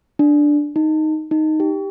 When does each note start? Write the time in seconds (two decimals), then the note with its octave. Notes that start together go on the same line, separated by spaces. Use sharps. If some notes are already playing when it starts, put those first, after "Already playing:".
0.19 D4
0.76 D#4
1.31 D#4
1.60 G4